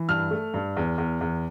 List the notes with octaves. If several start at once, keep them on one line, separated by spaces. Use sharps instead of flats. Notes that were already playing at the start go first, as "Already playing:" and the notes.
Already playing: E3
G2 F6
A3
G2
E2
E2
E2